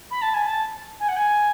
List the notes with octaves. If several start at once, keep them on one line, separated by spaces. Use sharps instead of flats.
B5
A5
G#5
A5
G#5
F#5
G#5